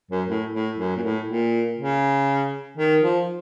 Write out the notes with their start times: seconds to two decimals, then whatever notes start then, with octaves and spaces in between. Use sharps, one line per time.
0.11 F#2
0.28 A2
0.53 A2
0.78 F#2
0.96 A#2
1.03 A2
1.28 A#2
1.78 C#3
2.78 D#3
3.02 F3